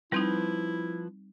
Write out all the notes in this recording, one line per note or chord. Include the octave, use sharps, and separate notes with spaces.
F3 G3 C4 D#4 E4 B4 G6